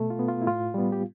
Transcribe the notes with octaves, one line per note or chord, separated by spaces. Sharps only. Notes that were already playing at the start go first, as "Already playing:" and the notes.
Already playing: B2 A3 A4
F4
B3
F4
E4
A2 F4
G3 B3
G4